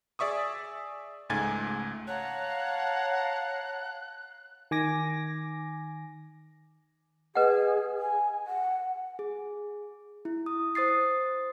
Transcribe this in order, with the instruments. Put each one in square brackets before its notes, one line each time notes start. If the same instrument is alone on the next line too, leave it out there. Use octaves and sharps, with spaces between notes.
[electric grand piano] G#4 D5 E5 C#6 D#6
C#2 G#2 A3 G#5 G#6 A6
[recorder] C#5 [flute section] F5 A5 A#5 [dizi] F#5 [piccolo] F#6
[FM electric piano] D#3 G#5 D6 A#6
[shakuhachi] G#4 [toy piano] B4 D#5 F#5
[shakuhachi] G#5
F#5
[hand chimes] G#4
E4
D#6
C5 D#6 A6 C7